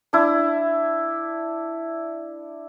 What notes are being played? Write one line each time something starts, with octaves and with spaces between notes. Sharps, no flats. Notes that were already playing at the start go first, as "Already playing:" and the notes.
D4 E4